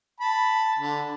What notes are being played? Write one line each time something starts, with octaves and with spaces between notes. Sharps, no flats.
A5 B5
D3